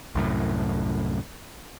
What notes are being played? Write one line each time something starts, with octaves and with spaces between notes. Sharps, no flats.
C2 F#2 A2